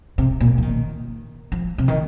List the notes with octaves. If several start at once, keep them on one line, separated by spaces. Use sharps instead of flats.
C3
A#2
F3
D#3
F3
C3
D#3